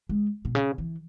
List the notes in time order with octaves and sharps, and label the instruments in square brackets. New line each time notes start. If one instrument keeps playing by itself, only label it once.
[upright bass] G#3
B2
C#3
E3